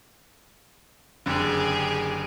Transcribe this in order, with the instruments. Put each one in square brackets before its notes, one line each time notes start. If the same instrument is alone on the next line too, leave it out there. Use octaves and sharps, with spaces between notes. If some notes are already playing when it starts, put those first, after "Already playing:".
[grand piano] F#1 D3 [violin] G4 G#4